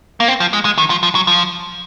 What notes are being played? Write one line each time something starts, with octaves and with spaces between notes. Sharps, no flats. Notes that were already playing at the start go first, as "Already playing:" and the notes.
A#3
C4
F3
G#3
G#3
D#3
F3
F3
F#3
F3